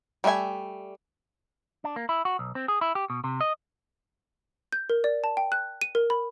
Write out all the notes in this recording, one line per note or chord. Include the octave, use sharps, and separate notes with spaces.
G3 A3 B4 E5 G#5
D4
A#3
E4
F#4
B1
C4
G#4
E4
G4
B2
C3
D#5
G6
A#4
D5
A5
G5
F#6
D#7
A#4
B5